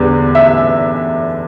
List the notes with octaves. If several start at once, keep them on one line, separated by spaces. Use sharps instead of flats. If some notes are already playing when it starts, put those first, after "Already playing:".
Already playing: E2 D3 G3
E5